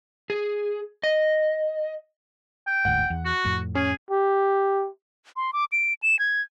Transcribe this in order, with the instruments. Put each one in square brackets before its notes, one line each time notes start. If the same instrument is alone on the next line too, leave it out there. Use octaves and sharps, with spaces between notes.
[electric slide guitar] G#4
D#5
[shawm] G5
[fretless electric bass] F#1 D2 G#2 [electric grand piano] F#5
[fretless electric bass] E2
[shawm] F#4
[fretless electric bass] F2 A2
[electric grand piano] C#4 [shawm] G#4
[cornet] G4
[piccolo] C6
D6
D7
E7
G#6